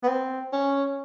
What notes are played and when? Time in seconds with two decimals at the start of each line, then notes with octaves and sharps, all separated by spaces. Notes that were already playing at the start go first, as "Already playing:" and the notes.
0.03 B3
0.08 C4
0.53 C#4